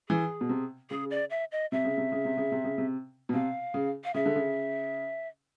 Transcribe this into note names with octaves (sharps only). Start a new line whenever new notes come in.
E3 G#4
B2
C3
C#3 G#4
D5
E5
D#5
C3 E5
C#3
C3
C#3
C3
C#3
C3
C#3
C3
B2
C3 F5
C#3
F5
C#3 E5
D3
C#3